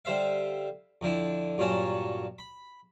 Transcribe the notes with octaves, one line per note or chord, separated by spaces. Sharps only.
D3 G3 C5 E5 F5
F2 D3 D4 E4
G2 A#2 F#3 C#4 F#4 A5
B5